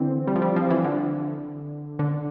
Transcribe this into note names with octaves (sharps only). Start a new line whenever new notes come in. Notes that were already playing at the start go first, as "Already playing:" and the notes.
Already playing: D3 E3 C4
G3
F3
G3
F3
E3
D3
D3